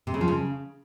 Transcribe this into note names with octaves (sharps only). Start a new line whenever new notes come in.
C3
C#3
F3
C#3